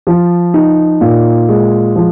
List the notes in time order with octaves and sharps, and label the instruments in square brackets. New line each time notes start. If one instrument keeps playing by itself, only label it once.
[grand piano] F3
D#4
A#2
G#3
F3